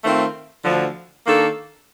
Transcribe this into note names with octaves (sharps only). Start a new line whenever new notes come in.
D#3 A3 C4 F4
D2 D3 F3
D#3 A#3 D4 A4